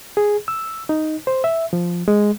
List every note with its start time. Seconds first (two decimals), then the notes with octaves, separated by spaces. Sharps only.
0.17 G#4
0.48 E6
0.89 D#4
1.27 C5
1.44 E5
1.73 F3
2.08 G#3